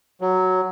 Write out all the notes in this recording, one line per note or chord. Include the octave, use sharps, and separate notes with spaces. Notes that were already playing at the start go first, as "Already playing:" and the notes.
F#3